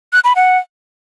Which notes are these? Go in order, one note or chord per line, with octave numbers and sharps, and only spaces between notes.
F#6
B5
F#5